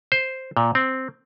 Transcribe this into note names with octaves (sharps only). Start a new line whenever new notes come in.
C5
A#2
C4